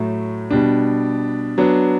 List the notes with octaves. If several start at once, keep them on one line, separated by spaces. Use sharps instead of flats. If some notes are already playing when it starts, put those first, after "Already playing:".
Already playing: A2 F#3 A3
B2 G3 D4
F#3 B3 D4